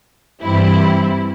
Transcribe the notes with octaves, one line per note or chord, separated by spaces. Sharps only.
G2 E3 G3 C4 E4